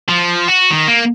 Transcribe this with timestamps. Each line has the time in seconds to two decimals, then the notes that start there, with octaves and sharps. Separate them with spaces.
0.09 F3
0.48 F#4
0.70 D#3
0.88 A#3